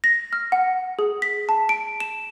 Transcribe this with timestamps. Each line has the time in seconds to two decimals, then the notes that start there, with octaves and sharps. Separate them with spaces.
0.04 A#6
0.33 F6
0.52 F#5
0.99 G#4
1.22 B6
1.49 A5
1.69 D7
2.00 E7